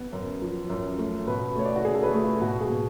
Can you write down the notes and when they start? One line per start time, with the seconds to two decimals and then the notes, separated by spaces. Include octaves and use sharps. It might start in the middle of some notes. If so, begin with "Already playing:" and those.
Already playing: B3
0.12 F#2
0.42 F3
0.70 F#2
0.98 A3
1.27 B2 B4
1.56 A3 C#5
1.65 D5
1.76 F#4
1.84 A3 G#4
1.94 A4
2.03 B4
2.13 A3
2.22 F4
2.41 B2 F#4
2.61 G#4
2.70 B2